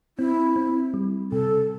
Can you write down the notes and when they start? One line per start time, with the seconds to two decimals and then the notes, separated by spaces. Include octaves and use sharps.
0.18 C4 E4
0.56 C4
0.94 G3
1.32 C3 A4